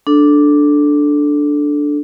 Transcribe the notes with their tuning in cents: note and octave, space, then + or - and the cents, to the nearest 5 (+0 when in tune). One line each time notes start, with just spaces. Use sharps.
D4 +0 A4 -10